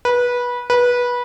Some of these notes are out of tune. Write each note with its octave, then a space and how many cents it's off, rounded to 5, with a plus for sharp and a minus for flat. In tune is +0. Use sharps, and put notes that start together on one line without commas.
B4 -20
B4 -20